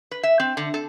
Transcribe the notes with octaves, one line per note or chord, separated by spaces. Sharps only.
B4
E5
C4
D3
A4